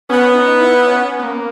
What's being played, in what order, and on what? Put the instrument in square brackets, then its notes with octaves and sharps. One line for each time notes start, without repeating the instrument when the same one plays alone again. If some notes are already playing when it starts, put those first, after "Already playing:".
[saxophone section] B3 [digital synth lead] C#4
[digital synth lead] D#4
E4
C#4
B3
A#3